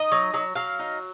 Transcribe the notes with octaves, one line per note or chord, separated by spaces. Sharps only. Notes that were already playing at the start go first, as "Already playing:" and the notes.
Already playing: D#4 D#5
F#3
F#3
F#3 F5
D#4